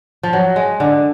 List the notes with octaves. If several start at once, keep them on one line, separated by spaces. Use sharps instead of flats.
F3
F#3
G#3
D3